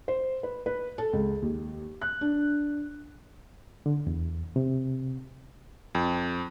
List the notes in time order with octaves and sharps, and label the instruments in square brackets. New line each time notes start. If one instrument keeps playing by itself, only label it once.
[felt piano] C5
B4
B4
A4
C#2
D#2
F#6
D4
[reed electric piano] D3
E2
C3
[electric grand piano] F2